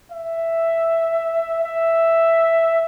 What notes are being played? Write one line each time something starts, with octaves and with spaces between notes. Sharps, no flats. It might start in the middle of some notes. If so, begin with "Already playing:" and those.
E5
E5